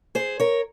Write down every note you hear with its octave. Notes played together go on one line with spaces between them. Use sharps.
G#4 C5
A#4 C#5